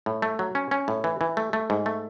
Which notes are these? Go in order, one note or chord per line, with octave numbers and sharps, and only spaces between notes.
A2
A3
F#3
C#4
C#4
A2
E3
E3
A3
A3
G#2
A3